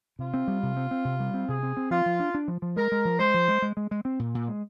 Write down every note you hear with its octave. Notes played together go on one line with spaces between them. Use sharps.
C3 F4
C4
G3
C3
C4
C4
C3
G3
C4
C3 G#4
C4
C4
F3 F4
F3
D4
D4
F3
F3
G#3 A#4
G#3
F3
G#3 C5
F3
G#3
G#3
G#3
G#3
C4
A#2
A#2
G#3